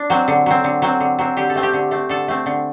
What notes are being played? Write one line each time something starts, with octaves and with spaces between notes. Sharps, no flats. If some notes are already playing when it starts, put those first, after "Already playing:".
Already playing: D4
F#3 C4
D3
F#3 C4
D3
F#3 C4
D3
F#3 C4
D3 G4
A4
A3 C4
G4
D3
A3 C4
D3 A4
A3 C4
D3